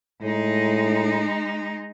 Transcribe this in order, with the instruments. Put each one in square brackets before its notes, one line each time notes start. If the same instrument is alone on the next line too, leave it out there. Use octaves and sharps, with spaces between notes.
[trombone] A2 [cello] G#3 D#4